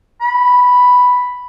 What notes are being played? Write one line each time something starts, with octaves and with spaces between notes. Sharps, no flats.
B5